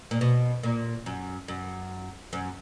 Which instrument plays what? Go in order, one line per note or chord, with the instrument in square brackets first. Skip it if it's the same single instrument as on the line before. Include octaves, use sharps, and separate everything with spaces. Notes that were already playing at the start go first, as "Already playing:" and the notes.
[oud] A#2
B2
A#2
F#2
F#2
F#2